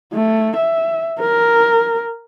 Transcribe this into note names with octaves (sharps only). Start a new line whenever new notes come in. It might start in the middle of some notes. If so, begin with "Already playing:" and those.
A3
E5
A#4